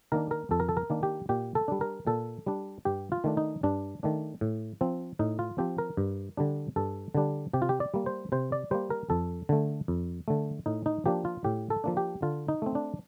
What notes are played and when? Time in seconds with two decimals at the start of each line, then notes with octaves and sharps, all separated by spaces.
0.12 D#3 A#3 D4 A#4
0.31 A#4
0.51 F2 A4
0.60 A#4
0.69 A4
0.77 A#4
0.90 D#3 A#3 D4
1.03 G4
1.29 A#2 G4
1.55 A4
1.68 G3 D4
1.81 A#4
2.07 A#2 A4
2.46 G3 D4
2.85 G2 G4
3.12 F4
3.24 D#3 A3 D4
3.37 D#4
3.63 G2 D4
4.03 D#3 A3 D4
4.41 A2
4.81 F3 C4
5.19 A2 D#4
5.39 F4
5.58 F3 C4 G4
5.78 A#4
5.97 G2
6.37 D3 G3 D4
6.76 G2 A4
7.15 D3 G3 D4
7.53 C3 G4
7.62 F4
7.69 G4
7.80 D5
7.94 G3 A#3
8.06 C5
8.32 C3 C5
8.52 D5
8.71 G3 A#3 C5
8.90 A#4
9.10 F2 A4
9.49 D3 A3
9.88 F2
10.28 D3 A3
10.66 A2 D#4
10.86 D#4
11.06 F3 A#3 D4 G4
11.25 F4
11.44 A2 G4
11.70 A4
11.84 F3 A#3 D4
11.97 G4
12.22 D3 F4
12.48 D#4
12.62 A3 C4
12.75 D4